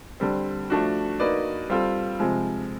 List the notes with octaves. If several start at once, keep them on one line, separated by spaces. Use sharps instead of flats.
D3 G3 C4
F3 A3 D4 F#4
A#3 D#4 F#4 B4 D5
G3 C4 F4 A4
C3 F3 G#3